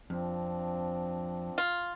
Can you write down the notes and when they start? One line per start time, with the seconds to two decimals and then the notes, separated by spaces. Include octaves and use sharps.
0.10 F2 F3 C4 D4
1.58 F4